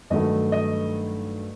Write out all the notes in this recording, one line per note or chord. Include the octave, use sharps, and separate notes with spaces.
G2 D#3 F#3 A3 D#5
D#5